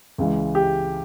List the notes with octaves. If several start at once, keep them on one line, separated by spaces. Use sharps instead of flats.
C#2 C#3 E3
G4